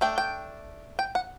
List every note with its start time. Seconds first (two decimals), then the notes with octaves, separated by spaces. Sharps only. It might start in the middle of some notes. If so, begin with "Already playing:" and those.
0.01 A3 D4 G5
0.18 G5
0.99 G5
1.15 F#5